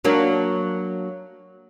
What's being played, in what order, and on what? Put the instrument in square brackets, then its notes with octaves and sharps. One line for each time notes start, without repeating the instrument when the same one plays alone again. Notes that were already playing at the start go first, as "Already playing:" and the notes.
[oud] F#3 A#3 D4